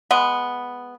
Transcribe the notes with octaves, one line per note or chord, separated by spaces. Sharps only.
G#3 B3